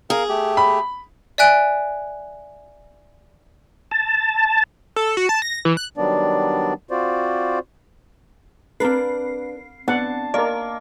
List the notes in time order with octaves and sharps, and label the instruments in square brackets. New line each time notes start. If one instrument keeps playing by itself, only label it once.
[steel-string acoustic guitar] G#4 [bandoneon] A#4 F5
[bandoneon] A3 G4
[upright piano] B5
[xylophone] D5 E5 G#5 F#6 D7
[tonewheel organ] A5
[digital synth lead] A4
F#4
A5
A#6
E3
F#6
[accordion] D#3 F#3 G3 B3 D4 D5
C4 F4 F#4 C5 D5
[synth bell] C4 C7 [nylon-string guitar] D4 A#4 B4
[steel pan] B3 F#5 [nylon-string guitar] D4 [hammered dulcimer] A5
[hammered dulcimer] A#3 [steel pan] A#4 D5 [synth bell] D#5